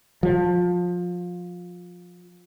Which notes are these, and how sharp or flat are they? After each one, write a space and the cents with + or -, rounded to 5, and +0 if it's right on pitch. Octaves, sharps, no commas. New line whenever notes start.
F3 +20